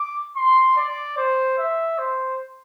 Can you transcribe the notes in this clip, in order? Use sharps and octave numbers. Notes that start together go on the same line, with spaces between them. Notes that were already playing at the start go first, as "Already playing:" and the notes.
Already playing: D6
C6
D5
C5
E5
C5